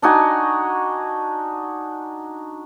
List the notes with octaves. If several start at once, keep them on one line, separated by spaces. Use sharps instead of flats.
D4 D#4 F#4 G#5